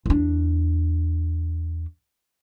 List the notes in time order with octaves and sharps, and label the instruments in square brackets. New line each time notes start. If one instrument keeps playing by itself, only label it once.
[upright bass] E2 D4